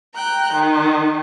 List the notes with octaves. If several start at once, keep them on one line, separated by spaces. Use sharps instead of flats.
G5 A#5 F#6
D#3